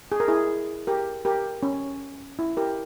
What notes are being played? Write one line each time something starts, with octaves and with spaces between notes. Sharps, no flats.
G#4
A#4
E4 G#4
G4 A#4
G4 A#4
C#4
E4
G4 A#4